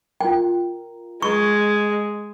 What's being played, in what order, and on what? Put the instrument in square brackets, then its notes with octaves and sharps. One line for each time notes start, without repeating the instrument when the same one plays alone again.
[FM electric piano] F4 A#4 [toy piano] G5
[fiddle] G#3 [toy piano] C#6